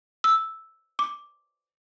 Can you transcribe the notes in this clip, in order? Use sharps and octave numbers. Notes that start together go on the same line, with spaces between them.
E6
D6